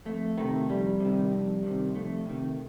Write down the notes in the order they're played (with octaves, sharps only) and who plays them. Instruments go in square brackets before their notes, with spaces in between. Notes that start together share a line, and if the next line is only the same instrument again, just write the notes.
[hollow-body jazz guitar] F2 A3
C3 D#3 A3
F2 G3
C3 D#3
F2
C3 D#3
F2 A3
C3 D#3